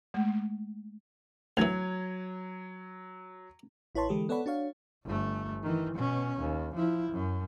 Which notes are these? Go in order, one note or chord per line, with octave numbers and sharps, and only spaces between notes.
G#3 A3
D2 E3 F#3 G#6 F7
A1 E4 B4 C#5 A5 C6
D3 E3 G#3 G4 A4
B3 A4 C#5 D5 F#5 B5
D4 F#4 C#5 F5
G1 A3
D#3 E3
B2 C#4
D#2
F3 E4
F#2